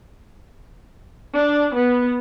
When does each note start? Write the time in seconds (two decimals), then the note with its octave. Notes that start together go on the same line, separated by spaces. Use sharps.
1.35 D4
1.74 B3